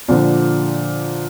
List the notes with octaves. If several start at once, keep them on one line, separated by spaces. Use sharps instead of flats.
A#2 D3 F3